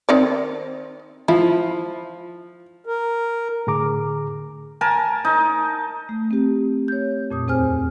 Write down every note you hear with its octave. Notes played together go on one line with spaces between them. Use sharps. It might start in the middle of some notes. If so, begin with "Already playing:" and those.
D#3 C4 D5
F3 E4
A#4
A2 D3 G#4 A#5 D6
A#4 G#5 A5
D#4
A3
C4 G4
C#5 G6
F2 A#2 D#6
D#2 C4 G#4 C5 G#5 F6